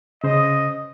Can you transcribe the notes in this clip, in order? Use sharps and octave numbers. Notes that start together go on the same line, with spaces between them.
C#3 C5 D#5